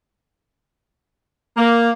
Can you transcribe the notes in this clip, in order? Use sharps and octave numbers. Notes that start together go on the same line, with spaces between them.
A#3